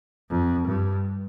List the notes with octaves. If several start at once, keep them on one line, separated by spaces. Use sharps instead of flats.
F2
G2